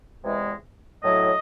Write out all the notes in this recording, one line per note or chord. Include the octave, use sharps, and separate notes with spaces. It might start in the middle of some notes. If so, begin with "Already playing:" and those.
E2 C3 E3 G#3
A2 F#3 D#5